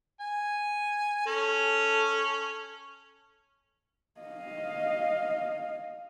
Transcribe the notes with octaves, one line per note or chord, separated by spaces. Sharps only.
G#5
C#4 A4
D#5 F5